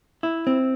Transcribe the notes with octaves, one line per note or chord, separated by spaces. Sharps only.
E4
C4